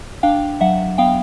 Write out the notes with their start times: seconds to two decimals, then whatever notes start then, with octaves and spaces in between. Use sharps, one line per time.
0.23 D4 F5 G5
0.61 F#3 E5 F#5
0.98 B3 F5 G5